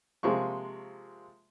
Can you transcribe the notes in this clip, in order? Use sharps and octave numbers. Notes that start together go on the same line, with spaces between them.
C3 F3 G#3 A#3 C#6